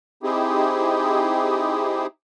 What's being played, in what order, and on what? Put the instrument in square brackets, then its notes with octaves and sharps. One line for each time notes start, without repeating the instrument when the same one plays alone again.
[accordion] C4 D#4 E4 G4 G#4